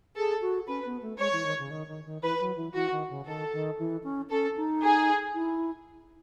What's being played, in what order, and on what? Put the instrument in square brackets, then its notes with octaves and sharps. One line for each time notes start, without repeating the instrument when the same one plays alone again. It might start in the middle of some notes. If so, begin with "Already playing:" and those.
[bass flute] G#4 [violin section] A4
[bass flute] F#4
[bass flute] C#4 [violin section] B4
[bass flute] B3
A3
[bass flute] G#3 [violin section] C#5
[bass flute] E3
D#3
C#3
D#3
D#3
D#3
[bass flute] E3 [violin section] B4
[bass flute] F#3
E3
[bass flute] E3 [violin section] F#4
[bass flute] D#3
C#3
[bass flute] D#3 [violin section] A4
[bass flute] D#3
E3
C#4
[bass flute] C#4 [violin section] A4
[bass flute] D#4
[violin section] G#4
[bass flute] E4